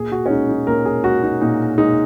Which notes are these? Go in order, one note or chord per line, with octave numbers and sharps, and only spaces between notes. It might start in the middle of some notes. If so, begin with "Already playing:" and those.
Already playing: A#2 G#4
F#4
C#4
G#3 D#4
D#4
A#2 A#4
G#4
G#3 F#4
D#4
A#2 D#4
G#3 D#4